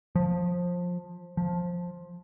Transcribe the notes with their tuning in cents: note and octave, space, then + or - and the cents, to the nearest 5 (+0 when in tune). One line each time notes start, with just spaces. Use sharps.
F3 +20
F3 +10